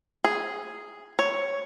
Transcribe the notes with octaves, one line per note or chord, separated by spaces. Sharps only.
G#4
C#5